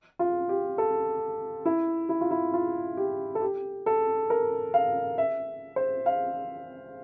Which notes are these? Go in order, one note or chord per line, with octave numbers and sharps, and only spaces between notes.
F4
G4
A4
E4
E4
F4
E4
F4
G4
A4
G4
A4
A#4
F5
E5
C5
F5